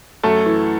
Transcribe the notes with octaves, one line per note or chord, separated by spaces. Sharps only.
F#2 A3 A4
E3